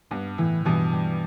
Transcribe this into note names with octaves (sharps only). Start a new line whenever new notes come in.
G2 B3
A2 E3
G2 B2 E3
G3